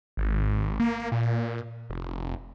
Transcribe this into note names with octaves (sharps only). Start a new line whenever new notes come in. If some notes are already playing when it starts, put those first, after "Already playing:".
G#1
A#3
A#2
F1